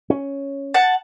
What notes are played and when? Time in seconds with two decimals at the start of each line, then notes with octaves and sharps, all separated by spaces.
0.10 C#4
0.74 F#5 A5